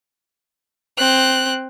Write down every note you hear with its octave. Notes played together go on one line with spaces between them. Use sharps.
C4 F#6